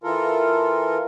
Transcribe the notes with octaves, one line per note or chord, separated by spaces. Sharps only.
E3 F4 A4 A#4